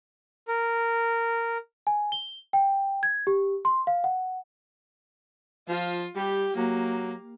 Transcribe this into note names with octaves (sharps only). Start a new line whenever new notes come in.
A#4
G#5
G7
G5
G#6
G4
C6
F5
F#5
F3 F4
G3 G4
F#3 A#3